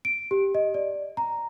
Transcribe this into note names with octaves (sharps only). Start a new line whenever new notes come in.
D7
G4
D#5
D5
A#5